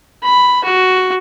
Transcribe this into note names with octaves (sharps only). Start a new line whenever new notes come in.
B5
F#4